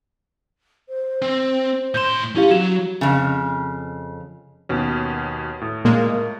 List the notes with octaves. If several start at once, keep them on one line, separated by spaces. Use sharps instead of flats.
C5
C4
A2 C6 G6 E7
C#4 E4 G4 F5
F#3 F#4 E7
F2 C#3
D#2 B2 C#4
A2
A#2 G#3 A#3